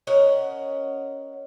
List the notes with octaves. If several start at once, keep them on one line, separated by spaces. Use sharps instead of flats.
C#4 A#4 D#5 F#5